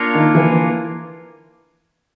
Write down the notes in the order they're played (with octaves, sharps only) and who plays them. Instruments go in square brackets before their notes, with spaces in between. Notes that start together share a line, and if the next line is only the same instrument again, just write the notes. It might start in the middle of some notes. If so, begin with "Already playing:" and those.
Already playing: [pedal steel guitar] A#3 D4 F4 A#4 C#5
[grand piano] D#3
E3